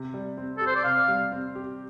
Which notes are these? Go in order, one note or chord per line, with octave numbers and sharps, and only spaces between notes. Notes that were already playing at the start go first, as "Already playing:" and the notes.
Already playing: C3
G3
C4
G4 A4
C5
D5
C3 F5
G3
C4
G4